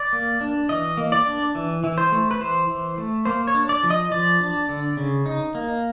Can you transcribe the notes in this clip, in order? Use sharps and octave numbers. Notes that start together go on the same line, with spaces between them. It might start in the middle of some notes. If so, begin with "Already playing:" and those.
Already playing: D5
A#3
D4
E3 D#5
A#3
D5
D4
E3
E3
C5
A3
B4
E3 C5
E3
A3
A#3 C5
C#5
D4
D5
F3
D#5
F3 D5
D4
D3
C#3
D#4
A#3